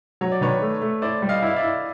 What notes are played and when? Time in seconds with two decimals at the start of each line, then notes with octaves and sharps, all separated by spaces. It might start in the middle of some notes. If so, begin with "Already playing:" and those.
0.21 F#3 C#5
0.32 D5
0.41 D#3 B4 C#5
0.62 A3
0.82 A3
1.02 E4 C5 D5
1.22 G3
1.29 D#5 F5
1.42 E4 F5
1.56 D5 E5
1.62 E4